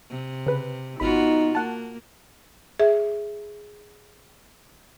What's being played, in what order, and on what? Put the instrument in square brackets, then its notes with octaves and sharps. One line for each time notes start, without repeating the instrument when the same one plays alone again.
[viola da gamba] C3
[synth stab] C#3 B4
[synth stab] G#1 B5 [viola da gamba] B3 F4 F#4 [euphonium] D#4
[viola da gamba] A#3 [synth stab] F#5 A5
[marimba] G#4 E5